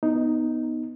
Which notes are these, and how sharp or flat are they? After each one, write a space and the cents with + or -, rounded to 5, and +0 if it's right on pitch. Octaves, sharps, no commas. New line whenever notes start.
B3 +0 D#4 +0